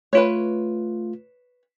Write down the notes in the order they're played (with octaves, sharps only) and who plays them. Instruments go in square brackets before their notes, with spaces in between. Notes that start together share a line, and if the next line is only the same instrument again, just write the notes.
[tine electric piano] A3 F4 [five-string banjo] B4 C#5